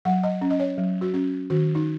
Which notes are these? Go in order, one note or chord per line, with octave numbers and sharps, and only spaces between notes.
F#3 F#5
D#5
C#4
D#5
C#5
F#3
F#4
C#4
D#3 F#4
D#4